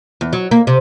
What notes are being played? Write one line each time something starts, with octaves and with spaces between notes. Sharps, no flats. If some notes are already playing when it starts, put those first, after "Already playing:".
E2
F#3
A#3
C3